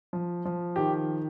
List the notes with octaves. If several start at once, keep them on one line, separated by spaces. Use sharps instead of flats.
F3
F3
D#3 G4